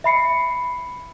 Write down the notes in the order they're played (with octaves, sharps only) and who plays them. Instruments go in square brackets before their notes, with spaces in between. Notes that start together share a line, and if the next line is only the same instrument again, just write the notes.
[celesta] E5 B5 C7 C#7